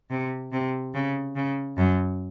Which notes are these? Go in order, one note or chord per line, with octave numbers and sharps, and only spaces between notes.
C3
C3
C#3
C#3
F#2